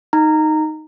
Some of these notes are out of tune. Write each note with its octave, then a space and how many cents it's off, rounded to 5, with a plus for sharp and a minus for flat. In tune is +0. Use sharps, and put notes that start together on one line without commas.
D#4 +0 A#5 -15